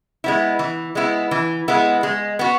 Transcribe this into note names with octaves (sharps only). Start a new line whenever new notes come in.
G#3 B3 E4
E3
G#3 B3 E4
E3
G#3 B3 E4
G#3
B3 F#4